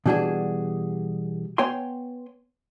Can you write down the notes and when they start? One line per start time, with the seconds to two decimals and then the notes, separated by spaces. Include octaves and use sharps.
0.06 B2 E3 G3 D4 F#4 G#4
1.58 B3 C#5 G5 G#5 C6